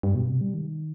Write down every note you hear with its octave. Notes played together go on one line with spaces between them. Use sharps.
G2
B2
C3
G3
D#3